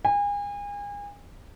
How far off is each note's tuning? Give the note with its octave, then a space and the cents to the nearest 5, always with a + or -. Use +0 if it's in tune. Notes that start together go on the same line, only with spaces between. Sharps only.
G#5 -35